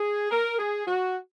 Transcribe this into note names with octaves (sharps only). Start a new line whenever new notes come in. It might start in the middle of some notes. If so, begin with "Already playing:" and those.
Already playing: G#4
A#4
G#4
F#4